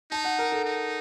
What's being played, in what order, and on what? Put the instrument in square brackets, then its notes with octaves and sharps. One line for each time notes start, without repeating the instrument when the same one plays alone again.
[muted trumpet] D#4 [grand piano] A5
[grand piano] F#5
A#4
A4
[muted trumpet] D#4